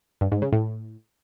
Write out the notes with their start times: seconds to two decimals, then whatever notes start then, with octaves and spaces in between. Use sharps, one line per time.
0.21 G2
0.32 G#2
0.42 C#3
0.52 A2